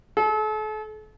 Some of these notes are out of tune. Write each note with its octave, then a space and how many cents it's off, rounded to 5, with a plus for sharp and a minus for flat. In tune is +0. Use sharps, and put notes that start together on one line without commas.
A4 -40